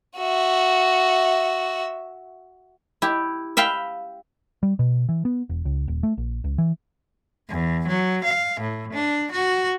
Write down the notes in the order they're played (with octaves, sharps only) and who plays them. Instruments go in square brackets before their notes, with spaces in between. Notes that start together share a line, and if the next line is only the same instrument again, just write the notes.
[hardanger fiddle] F#4 E5
[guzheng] E4 G4
E5 F5 G5 B5
[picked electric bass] G3
B2
E3
B3
E1
C#2
D#1
A3
A#1
C#2
E3
[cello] E2
F#3
F5
A2
D4
F#4